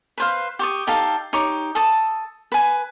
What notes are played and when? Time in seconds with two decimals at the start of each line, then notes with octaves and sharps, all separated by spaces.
0.18 B4 C5 F5
0.59 G4 C#6 D#6
0.87 D#4 G4 A4 F5
1.33 D#4 G4 C#5 D6
1.75 A4 A5 D#6
2.52 B4 G#5